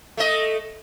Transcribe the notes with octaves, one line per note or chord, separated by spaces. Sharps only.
A3 D#5